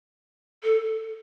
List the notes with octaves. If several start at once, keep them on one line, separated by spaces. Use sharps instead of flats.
A4